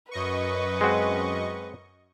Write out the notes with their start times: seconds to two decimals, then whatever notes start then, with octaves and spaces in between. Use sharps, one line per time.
0.11 F#2 B4 D#5 C#6
0.81 G#3 C4 F#4